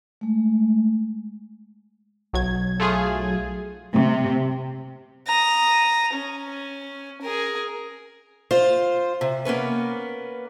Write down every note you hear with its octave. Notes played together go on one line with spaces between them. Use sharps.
G#3 A3
B1 F#3 G#6
A3 F4 G#4
C3
A#5 D#6
C#4
G#4 A#4
F4 C5
C3
A#3 B3 C#4 B4